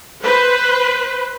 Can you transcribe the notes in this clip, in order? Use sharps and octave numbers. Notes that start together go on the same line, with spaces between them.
B4 C5